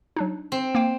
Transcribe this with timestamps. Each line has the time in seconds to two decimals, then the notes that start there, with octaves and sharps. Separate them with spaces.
0.16 F#3 D4 D#4
0.52 C4
0.75 A#3 F5 G5